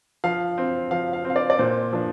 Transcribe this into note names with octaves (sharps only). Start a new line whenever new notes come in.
F3 F5
C4
F3 F5
F5
C4
F5
D5
D5
A#2 C5
F3 D4